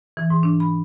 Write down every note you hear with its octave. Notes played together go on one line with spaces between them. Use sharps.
E3
G#2
D4
B5